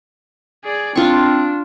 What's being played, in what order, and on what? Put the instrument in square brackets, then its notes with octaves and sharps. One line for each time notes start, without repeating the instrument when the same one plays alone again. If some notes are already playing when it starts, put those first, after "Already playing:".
[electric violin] G#4 D5
[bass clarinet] C4 [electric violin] D4 [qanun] F4 C#6